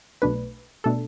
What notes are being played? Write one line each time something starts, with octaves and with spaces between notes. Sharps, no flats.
B1 B2 A3 D4 B4
B2 A3 D4 A4